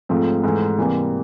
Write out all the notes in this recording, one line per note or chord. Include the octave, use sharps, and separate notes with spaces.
G#2 F3 A3 C4
G#2 E3 A3
C3 E3 G3 A#3